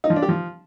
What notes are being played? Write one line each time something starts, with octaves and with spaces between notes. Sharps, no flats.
D#4
F3
D4
G4
F3